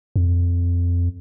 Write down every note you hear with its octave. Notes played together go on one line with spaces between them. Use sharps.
F2